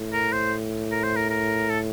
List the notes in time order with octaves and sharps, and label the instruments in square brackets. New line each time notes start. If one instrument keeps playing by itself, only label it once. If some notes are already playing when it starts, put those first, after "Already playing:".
Already playing: [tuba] A2
[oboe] A#4
C5
A#4
C5
A#4
A#4
A4